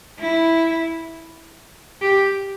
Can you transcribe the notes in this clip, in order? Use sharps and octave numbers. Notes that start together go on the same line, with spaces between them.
E4
G4